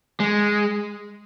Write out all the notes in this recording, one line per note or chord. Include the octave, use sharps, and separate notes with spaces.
G#3